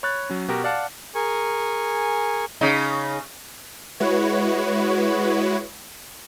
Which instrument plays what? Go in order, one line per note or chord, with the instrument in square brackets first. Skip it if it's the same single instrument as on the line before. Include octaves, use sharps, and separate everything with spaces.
[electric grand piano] C#5 B5 F#6 A6
F#3 C#4
B2 F#4 G4 A#4
D5 F5 F#5 A5
[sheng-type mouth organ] G#4 A#4 G#5 C#6
[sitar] C#3 D#4
[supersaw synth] G#3 E4 F#4 B4 C#5